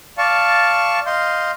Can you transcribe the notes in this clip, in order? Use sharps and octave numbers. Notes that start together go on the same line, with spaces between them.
D5 F5 A5 C#6
D#5 F5 C6 G6